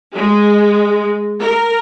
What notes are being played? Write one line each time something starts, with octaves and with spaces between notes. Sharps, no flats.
G#3
A#4